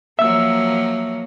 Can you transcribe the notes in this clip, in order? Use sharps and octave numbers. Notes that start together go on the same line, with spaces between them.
F3 F#3 A#3 E5 E6